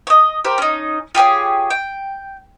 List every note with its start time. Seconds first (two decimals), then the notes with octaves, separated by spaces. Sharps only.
0.07 C#5 D#5
0.44 G4 A#4 C5
0.58 C#4 D#4
1.15 F4 G4 G#4 C#5
1.70 G5